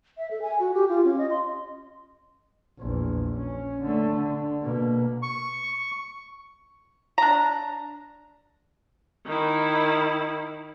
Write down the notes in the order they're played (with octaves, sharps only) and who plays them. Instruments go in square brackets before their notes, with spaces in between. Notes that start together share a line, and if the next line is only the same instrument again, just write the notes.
[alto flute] E5
A4
G#5
F#4
G4
F4
C#4
D#5
C6
[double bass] A#1 E2
C#4
D3 A3
D3
B2 A#3
[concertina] C#6
[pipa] D4 A#5
[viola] D#3 E4